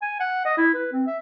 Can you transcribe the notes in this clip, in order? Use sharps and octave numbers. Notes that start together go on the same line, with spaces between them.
G#5
F#5
D#5
E4
B4
C4
E5